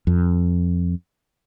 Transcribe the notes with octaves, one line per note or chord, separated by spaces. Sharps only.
F2